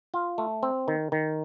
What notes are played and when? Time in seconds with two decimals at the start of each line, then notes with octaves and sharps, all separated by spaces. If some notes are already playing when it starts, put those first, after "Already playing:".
0.14 F4
0.38 A3
0.63 C4
0.88 D#3
1.12 D#3